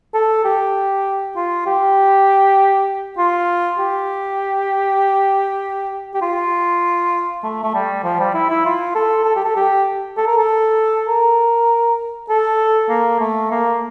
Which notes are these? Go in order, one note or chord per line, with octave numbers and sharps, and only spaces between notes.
A4
G4
F4
G4
F4
G4
G4
F4
A3
A3
G3
F3
G3
E4
E4
F4
A4
A4
G4
A4
G4
A4
A#4
A4
A#4
A4
A#3
A3
A#3